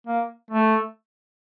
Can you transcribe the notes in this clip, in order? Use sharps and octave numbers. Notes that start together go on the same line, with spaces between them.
A#3
A3